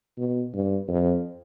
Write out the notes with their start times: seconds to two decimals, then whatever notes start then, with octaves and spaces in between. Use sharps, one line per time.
0.18 B2
0.54 G2
0.88 F2